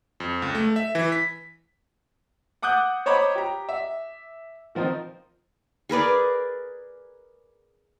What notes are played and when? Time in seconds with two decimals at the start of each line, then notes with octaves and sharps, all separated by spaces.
0.20 F2
0.42 C#2
0.55 A3
0.76 E5
0.95 E3
1.12 B6
2.62 F#5 D6 D#6 F#6 G6
3.06 C5 C#5 D#5 A#5 B5 D6
3.35 G4 A#5
3.69 E5
4.75 D#3 F3 C4 D#4
5.89 G#4 A#4 B4 D5